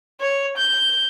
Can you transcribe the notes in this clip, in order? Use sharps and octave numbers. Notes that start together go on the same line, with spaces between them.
C#5
G6